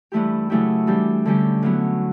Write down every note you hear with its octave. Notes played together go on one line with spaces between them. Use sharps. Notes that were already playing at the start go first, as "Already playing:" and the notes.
G2 E3 A3 E4 G4
C#3 F#3 A3 E4 G4
E3 G3 D4 G4
D3 G3 C#4 G4
A2 F#3 B3